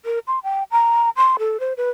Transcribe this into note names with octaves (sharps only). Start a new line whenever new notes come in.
A#4
C6
G5
A#5
C6
A4
C5
B4